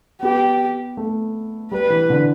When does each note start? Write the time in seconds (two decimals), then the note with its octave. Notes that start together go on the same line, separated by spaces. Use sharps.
0.21 B3 G4
0.97 A3
1.71 G3 B4
1.90 E3
2.10 D3